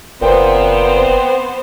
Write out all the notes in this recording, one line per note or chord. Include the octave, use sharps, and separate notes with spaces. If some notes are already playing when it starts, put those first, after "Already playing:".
F#1 A#2 B3 C4 C5 G5